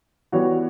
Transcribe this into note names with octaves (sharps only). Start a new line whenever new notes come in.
E3 G3 B3 F#4 C#5